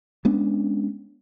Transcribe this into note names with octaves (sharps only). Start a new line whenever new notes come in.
G#3 B3 C#4 D4